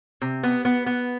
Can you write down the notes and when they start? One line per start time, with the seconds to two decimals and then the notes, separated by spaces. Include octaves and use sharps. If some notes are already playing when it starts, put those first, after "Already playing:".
0.22 C3
0.43 B3
0.65 B3
0.86 B3